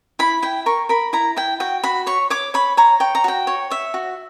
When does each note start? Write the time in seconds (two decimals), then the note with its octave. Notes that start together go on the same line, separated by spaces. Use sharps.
0.19 E4 B5
0.42 E4 G5
0.66 A#4 C#6
0.89 A#4 B5
1.13 E4 A#5
1.37 E4 G5
1.60 F#4 G5
1.84 F#4 B5
2.07 C#5 C#6
2.30 C#5 D6
2.54 C#5 B5
2.77 C#5 A#5
3.00 C#5 G5
3.15 A#5
3.24 F#4 G5
3.47 C#5
3.70 C#5 E5
3.94 F#4